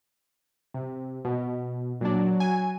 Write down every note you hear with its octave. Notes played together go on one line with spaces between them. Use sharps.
C3
B2
A#2 F#3 D4
G#5